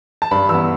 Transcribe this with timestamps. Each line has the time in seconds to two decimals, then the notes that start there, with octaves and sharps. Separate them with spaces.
0.22 A5
0.31 G2 B5
0.49 E3 B3 E6